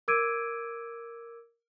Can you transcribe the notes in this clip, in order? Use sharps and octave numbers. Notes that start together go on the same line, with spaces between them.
A#4 D6 E6 G#6 D7 D#7